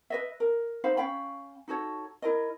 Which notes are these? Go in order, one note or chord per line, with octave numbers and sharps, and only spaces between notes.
B4 D#5 E5
A#4
D#4 C5 F5 B5
C#4 F5 G5 B5
D#4 F#4 A4 C#5
E4 A#4 D#5